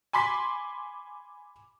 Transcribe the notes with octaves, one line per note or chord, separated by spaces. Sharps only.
G#5 B5 C6 D6 B6